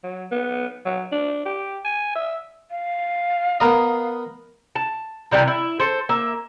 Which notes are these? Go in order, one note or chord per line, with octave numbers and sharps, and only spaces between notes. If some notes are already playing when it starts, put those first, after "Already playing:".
F#3
B3
F#3
D4
G4
G#5
E5
F5
B3 A#4 D#5
A5
C3 E3 G3 A#3
E4
A4 C5
A#3 E5